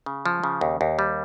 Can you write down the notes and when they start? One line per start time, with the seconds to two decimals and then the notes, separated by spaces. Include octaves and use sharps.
0.06 C#3
0.26 F3
0.44 C#3
0.61 D#2
0.81 D#2
0.99 G3